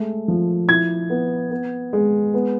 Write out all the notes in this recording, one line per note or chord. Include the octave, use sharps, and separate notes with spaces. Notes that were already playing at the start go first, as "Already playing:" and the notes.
Already playing: G#3 A3
F3
E4 G#6
B3
B3
G#3
B3